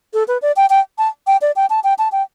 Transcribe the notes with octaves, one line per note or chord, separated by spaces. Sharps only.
A4
B4
D5
G5
G5
A5
G5
D5
G5
A5
G5
A5
G5